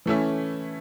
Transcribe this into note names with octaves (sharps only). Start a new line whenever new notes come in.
E3 A3 C#4 E4